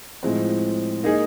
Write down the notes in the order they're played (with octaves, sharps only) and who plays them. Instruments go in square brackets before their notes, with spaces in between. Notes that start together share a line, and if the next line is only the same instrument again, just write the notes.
[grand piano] A2 F3 G#3 C4
A#3 D#4 G#4